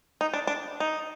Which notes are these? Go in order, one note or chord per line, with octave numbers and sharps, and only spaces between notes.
D#4
D4
D4
D#4